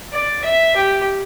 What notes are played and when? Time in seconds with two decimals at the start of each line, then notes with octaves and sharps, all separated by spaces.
0.13 D5
0.45 E5
0.76 G4